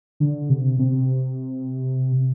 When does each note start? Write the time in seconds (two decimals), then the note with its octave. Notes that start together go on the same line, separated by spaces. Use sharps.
0.20 D3
0.50 C3
0.79 C3